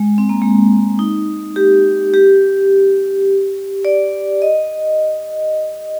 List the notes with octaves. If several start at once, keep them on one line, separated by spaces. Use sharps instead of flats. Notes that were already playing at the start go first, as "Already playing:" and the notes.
Already playing: G#3
C4
A#3
G#3
D#4
G4
G4
D5
D#5